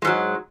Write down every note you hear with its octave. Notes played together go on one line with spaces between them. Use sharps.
G#2 F#3 G#3